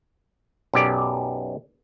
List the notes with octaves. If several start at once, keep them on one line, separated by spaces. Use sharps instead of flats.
B1 F#2 G4 D5